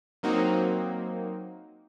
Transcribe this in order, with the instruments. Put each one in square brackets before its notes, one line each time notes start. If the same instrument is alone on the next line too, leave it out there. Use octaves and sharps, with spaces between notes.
[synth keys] F#3 A#3 C4 D#4 F#4